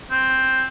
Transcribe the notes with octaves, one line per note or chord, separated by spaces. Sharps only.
C4